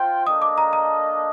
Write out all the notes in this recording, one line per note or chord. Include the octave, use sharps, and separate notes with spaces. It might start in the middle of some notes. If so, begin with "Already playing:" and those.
Already playing: F4 C5 G5
A#3 D4 A4 D#5 D#6
D6
A#5
A#5